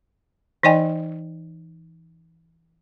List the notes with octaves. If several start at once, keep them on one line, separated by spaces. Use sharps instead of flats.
E3 D#4 D5 D#5 G5 G#5